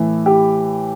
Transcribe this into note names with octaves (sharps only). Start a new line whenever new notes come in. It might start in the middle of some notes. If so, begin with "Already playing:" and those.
Already playing: A2 E3
G4